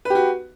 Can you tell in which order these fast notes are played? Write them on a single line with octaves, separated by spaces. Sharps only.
B4 G4 F#4